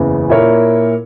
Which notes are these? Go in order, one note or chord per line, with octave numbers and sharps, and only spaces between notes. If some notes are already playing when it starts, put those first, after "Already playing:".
Already playing: F#1 E2 C#3 E3
A#2 A#3 E4 A#4 C#5